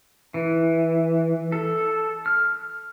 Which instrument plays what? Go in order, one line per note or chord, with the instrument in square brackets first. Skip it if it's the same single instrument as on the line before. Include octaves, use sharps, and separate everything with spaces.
[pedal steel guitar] E3
A4
F6